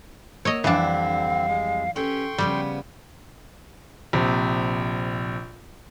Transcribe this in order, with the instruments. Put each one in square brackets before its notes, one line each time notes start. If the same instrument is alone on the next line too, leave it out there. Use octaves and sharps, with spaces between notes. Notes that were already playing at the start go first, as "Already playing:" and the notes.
[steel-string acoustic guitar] A#3 F#5 [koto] C#5 D#5 [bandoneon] E6
[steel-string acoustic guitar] F2 G3 E4 [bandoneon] D3 C4 [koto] E3 D4 [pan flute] F5
[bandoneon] G#3
[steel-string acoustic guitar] C#4 G4 B4 [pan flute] A4 [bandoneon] G5 C6 C#6
[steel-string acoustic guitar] C#3 F3 B3 [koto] G3
[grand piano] A#1 C3